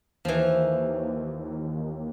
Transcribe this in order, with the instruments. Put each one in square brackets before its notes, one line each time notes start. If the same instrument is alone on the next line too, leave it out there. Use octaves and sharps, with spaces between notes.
[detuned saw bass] D#2 [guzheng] E3 F3